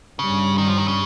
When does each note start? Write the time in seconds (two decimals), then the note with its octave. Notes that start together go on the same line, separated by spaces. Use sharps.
0.19 G2 C#3 G3 C#4
0.58 D#3
0.68 F3
0.78 D#3
0.88 C#3